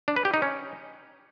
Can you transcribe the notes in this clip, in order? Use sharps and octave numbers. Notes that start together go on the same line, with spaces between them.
D4
B4
G4
D#4
C#4